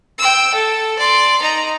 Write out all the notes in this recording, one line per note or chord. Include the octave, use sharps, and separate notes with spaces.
G5 E6
A4
D5 C6
D#4 A#5